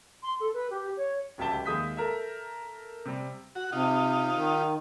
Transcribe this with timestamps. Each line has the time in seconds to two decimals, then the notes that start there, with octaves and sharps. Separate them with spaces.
0.23 C6
0.40 A4
0.54 B4
0.70 G4
0.97 C#5
1.38 D1 C#2 G4 E5 A5 G7
1.66 D#2 G#3 E5 D#6 G6 B6
1.97 A4 A#4 E5
3.05 C3 G3
3.55 F#4
3.72 C3 D#4 F4
4.35 D#3